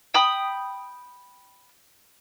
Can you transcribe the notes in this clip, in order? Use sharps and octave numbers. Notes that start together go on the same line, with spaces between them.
G5 B5 D#6